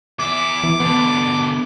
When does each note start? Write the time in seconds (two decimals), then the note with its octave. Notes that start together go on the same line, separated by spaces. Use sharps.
0.19 E2 E5 D6
0.64 E3
0.80 B2 D3 B3